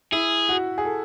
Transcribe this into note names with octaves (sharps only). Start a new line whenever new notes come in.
E4 G#4
F#4
G#4
A4